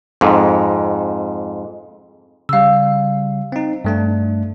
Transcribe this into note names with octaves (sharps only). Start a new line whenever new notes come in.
F2 G#2
C#3 G3 F5 E6
C4 D#4
G2 A3 D4